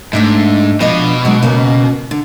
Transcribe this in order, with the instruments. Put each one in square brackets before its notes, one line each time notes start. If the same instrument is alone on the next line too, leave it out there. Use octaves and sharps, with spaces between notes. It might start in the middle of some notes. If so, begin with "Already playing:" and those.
[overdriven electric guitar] G#2 [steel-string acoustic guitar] A3 D4 E5
[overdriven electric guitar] B2 [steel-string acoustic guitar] F3 D4 D#5
[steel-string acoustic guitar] F#3 G#3 D4
C#3 A#3 C#4
D3